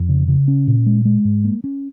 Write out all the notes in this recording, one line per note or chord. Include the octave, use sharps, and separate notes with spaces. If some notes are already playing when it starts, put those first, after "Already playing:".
Already playing: F2
C#3
C#3
C#4
A#2
G#3
G#3
G#2
A#3
C#4